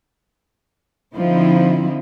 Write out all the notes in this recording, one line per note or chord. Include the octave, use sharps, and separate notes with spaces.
D3 F3 C4 D#4 E4